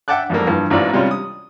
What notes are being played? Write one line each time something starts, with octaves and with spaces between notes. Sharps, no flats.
E5 F#5 G5 A5 D6 F#6
F2 G#2 G3 A3 A#3
G2 E3 F3
A1 G#2 E3 F4 D5
C3 G3 G#3 C#4 F4
D#6